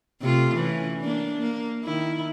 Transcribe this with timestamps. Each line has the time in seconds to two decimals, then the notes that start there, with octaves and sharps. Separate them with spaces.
0.21 C3 A3 F4
0.56 E3 C#4
1.00 A#3 D4
1.39 A#3
1.84 D#3 E4